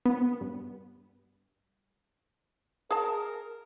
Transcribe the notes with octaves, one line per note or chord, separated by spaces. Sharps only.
B3
G2
G#4 A#4 A5